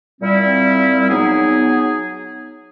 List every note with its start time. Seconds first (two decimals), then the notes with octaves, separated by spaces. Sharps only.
0.21 A#2 G3 C4 E4
1.09 F#3 B3 D#4 G#4